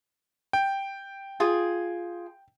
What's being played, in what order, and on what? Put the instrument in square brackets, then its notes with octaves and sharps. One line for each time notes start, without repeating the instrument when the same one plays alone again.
[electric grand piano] G5
[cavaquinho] F4 G#4